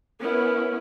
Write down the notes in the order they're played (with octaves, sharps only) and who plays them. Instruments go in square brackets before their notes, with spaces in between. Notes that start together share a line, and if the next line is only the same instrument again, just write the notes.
[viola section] B3 C#4 E4 [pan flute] A#4